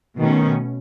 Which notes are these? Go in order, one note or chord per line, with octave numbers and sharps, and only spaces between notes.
B2 D#3 A3 C#4